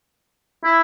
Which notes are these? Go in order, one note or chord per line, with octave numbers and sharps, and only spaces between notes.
E4